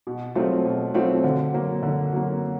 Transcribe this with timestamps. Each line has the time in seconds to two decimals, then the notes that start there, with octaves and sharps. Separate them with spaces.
0.07 B2
0.35 F#3 A3 C4 F4
0.65 B2
0.94 F#3 A3 C4 F4
1.24 D3
1.54 F#3 A#3
1.83 D3
2.12 F#3 A#3